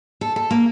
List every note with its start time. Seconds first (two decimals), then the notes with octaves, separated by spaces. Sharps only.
0.21 A4
0.36 A4
0.51 A#3